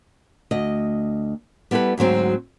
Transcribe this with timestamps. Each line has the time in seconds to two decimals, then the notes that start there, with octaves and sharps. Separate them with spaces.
0.51 D2 D#5
1.71 G3 B3 E4 A4 B4
1.98 D2 G#2 F#3 C4